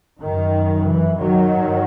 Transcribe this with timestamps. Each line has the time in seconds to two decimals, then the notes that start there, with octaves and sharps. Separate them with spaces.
0.20 F#2 D#3
0.86 E3
1.19 D#3 F#3
1.53 G2